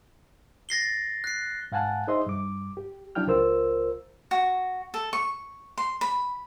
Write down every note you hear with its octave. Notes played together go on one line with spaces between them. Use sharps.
A6 A#6 C7 G7
F#6 C7
G#2 F5 F#5 G#5 A5 F#6
D#4 G#4 C5 D#5 E5 C6
G2 D6
G4
F#3 D4 E4 G5 F6
C#2 F4 A#4 C5 E6
F#4
A4
C#6
C6
B5